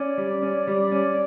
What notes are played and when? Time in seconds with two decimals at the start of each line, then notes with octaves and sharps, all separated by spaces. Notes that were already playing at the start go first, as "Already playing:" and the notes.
Already playing: C#4 D5
0.18 G3
0.42 C#4
0.67 G3
0.92 C#4